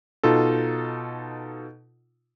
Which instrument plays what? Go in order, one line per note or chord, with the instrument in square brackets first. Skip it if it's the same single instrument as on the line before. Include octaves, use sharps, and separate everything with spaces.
[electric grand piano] B2 D#4 F4 A4